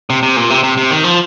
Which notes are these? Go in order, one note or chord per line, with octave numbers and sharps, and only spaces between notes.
C3
C3
A#2
C3
C3
C3
D#3
F3